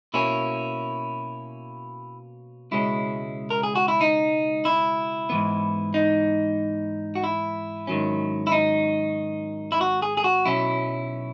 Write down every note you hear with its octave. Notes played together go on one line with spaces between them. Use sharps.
B2 A#3 C#4 E4
C#2 B2 G#3 C#4 E4
A#4
G#4
F#4
E4
D#4
E4
G#2 E3 B3
D#4
F#4
E4
G#2 D#3 F#3 C#4
E4
D#4
E4
F#4
G#4
G#4
F#4
B1 B2 F#3 C#4 E4